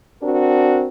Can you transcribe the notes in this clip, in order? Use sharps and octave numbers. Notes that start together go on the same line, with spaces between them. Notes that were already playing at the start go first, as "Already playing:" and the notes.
C4 D4 F#4 A#4